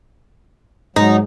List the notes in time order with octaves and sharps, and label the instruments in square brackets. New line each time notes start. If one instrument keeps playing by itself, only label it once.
[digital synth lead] G#2 [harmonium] F#3 [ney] G#3 [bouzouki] D#4